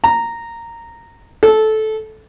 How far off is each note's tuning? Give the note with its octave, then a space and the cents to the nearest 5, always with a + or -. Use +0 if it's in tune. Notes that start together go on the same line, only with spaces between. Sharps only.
A#5 -10
A4 -15